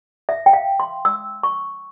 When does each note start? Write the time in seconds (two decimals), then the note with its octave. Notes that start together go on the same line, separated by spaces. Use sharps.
0.29 E5
0.46 G5
0.53 F5
0.80 C6
1.05 E6
1.43 C#6